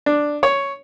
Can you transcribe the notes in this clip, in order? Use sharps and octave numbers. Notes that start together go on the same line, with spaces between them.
D4
C#5